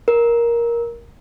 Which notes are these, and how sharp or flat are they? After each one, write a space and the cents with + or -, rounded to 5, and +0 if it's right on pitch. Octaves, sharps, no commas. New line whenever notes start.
A#4 +10